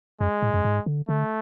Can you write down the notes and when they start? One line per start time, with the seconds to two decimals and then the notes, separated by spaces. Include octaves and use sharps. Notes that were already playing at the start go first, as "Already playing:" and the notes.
0.20 F#2 G#3
0.42 A2
0.54 F#2
0.65 G#2
0.86 D3
1.09 D3 A3